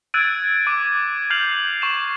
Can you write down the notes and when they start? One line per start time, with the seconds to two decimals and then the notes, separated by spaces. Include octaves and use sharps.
0.14 E6 F#6 G#6 A6 D7 D#7
0.67 D6 D#7
1.30 F6 G6 C7 F7 F#7
1.82 C#6 E7